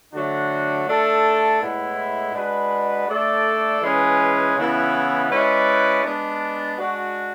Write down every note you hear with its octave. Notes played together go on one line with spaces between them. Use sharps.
D3 F#3 A3 D4 F#4
A3 D4 A4
A2 G#3 B3 E4
G#3 D4 F#4 B4
A3 D4 A4 D5
E3 G#3 C#4 G#4 B4
C#3 E3 B3 E4
G#3 C#4 E4 B4 D5
G#3 B3 D4
G#3 D4 F#4